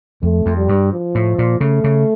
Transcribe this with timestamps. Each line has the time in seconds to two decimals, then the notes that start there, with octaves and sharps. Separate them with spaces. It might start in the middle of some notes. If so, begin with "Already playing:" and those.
0.23 F2 A3
0.46 F2
0.57 G3
0.69 G2
0.92 F3
1.15 A2
1.38 A#2
1.61 C#3 A3
1.84 C#3